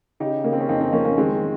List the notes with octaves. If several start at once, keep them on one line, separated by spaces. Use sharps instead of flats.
C#3 D#4 G4
C#3 A#3
C4
C#4
F2 C4 D#4
C4 D#4
F3 A#3 C#4
A#3 C#4
D#3 G#3 C4